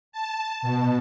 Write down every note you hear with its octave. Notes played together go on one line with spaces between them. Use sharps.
A5
B2